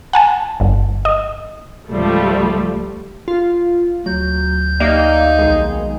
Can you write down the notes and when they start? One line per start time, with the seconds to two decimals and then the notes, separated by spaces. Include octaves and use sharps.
0.13 F#5 G#5 A5
0.60 G1
1.05 D#5
1.91 C#2 G#2 F3 G3 A3
3.28 F4
4.06 D2 F#3 G6
4.80 A#3 D#4 G4 D5 E5
5.39 B1 D#3 G#3